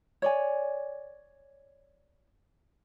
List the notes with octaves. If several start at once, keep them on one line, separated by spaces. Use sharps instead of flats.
C#5 D5 G#5